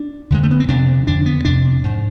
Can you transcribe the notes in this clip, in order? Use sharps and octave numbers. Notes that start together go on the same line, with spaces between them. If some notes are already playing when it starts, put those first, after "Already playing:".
Already playing: D4
F2 D3 G#3
A3
B3
C4
F2 C3 D4
F2 D3 D4
B3
F2 C3 D4
G#2